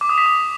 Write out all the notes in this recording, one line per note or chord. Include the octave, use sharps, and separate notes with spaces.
D6
D#6
B6
D6